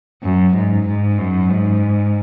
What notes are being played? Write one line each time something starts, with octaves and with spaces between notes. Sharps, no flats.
F#2
G#2
G#2
F#2
G#2